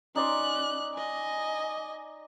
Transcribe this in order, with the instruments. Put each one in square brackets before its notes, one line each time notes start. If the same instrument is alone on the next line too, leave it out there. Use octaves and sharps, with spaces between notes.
[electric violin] C#4 F#6 [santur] D#4 D5 C6
[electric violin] D#5 G#5